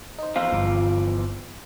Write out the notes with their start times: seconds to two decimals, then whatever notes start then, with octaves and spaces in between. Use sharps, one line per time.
0.18 D#4 C5
0.36 E2 F3 F4
0.52 G1 D6